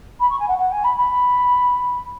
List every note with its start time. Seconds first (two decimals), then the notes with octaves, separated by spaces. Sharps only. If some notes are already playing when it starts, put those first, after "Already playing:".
0.19 B5
0.29 C#6
0.39 G#5
0.48 F#5
0.58 F#5
0.71 G#5
0.83 B5
0.97 B5